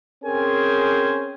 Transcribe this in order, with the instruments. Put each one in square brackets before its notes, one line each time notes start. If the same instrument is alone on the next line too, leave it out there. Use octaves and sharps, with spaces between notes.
[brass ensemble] C4 C#4 G#4 A#4 C5 G#5